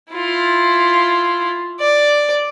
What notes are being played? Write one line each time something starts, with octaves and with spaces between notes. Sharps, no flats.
E4 F4
D5